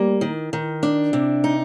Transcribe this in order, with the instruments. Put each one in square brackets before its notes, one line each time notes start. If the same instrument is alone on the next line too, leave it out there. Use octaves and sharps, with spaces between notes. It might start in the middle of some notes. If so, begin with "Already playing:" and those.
Already playing: [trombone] G3 [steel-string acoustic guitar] A#3
[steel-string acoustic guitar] D#3
D#3
D4
C3
D#4